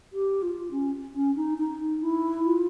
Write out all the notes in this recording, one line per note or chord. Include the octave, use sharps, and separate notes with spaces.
G4
F4
C#4
C#4
D#4
D#4
E4
F4